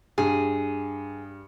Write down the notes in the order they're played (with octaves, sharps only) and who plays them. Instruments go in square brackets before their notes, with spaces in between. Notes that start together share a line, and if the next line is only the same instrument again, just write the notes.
[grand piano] G2 [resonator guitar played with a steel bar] G#4